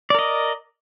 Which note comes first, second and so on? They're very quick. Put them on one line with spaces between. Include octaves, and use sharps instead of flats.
D5 A#4 D#5